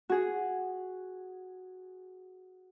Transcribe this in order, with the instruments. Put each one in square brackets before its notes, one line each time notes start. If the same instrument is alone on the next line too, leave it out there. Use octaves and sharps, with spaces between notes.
[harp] F#4 G#4